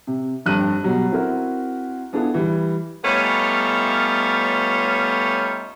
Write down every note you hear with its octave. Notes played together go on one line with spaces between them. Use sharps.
C3
F1 G2 G3 F#6 D#7
B2 F#3 G3
C4 E4 F#4 A#4
B3 D4 E4 F4 G#4 A4
E3 G3
G3 A3 B3 C#4 D#4 F4